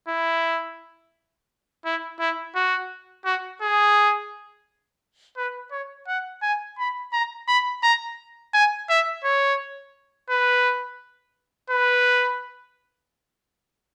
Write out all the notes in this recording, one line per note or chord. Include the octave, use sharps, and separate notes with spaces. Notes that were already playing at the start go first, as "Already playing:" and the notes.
E4
E4
E4
F#4
F#4
G#4
B4
C#5
F#5
G#5
B5
A#5
B5
A#5
G#5
E5
C#5
B4
B4